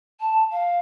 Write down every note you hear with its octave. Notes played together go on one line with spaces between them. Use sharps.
A5
F5